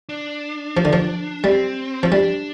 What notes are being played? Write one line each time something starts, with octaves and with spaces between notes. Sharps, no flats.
D4
F3
D3
F3
G3 C4
F3
G3 D4